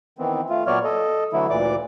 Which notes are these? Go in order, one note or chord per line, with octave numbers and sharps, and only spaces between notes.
D#3 E3 B3 C4
A3 F4
A#2 F#3 B3 C#5 D5 F6
A4 D#5
D3 E3 F#3 A3 E4
D2 A#2 E3 D5 D6